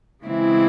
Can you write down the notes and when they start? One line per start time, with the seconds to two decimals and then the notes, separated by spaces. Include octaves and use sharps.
0.24 C#3 E3 G#3 C4 E4